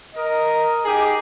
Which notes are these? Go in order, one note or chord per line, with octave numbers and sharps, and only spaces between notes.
A#4 D#5
D#4 G4 G#4